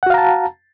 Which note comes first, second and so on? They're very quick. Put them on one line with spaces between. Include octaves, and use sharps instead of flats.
F#5 F#4 F5 A#5 A5